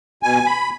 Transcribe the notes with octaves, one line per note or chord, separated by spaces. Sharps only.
B2 G#5
B5